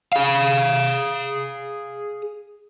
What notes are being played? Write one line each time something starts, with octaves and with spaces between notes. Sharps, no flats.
G#4 F5